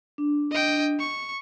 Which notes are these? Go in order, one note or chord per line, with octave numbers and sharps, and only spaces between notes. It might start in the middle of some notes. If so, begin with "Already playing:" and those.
D4
D#5 G5
C#6